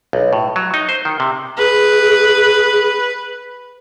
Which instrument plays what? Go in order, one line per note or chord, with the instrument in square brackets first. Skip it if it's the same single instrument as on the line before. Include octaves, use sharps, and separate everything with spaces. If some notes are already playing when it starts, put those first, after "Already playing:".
[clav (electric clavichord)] B1
A2
F#3
D#4
C5
D#3
C3
[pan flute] G#4 [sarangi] B4